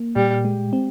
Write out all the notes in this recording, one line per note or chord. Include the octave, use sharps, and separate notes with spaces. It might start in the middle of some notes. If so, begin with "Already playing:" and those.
Already playing: A#3
A#2 G3
G#3
C4